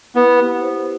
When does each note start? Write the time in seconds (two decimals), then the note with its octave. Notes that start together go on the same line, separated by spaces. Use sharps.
0.15 B3 E4
0.38 G4
0.61 C5